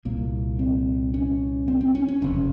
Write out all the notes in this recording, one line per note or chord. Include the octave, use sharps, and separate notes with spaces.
C2 A#2 A#3
C4
C#4
C4
C4
C#4
C#4
F#1 F2 C3 C#4